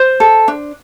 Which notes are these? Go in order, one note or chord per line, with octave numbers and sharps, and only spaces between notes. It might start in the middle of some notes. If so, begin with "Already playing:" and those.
Already playing: C5
A4
D4